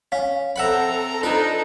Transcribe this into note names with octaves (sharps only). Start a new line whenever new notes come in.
C#4 F5
C4 A4 E5 F#5 A#5 B5
D4 D#4 F4 B4 A#5